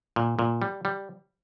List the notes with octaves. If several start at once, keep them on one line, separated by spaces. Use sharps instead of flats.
A#2
A#2
G3
G3